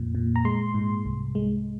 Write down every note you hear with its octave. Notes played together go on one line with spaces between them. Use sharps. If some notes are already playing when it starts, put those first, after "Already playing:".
Already playing: F2 A#2
A#2
A#5
G#3 C6
G#2
C2
G#3